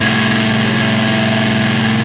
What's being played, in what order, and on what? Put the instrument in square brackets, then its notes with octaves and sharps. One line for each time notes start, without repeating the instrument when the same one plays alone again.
[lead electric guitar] C2 A2